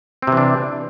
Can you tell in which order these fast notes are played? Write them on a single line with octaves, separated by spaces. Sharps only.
C4 C3 E3 D4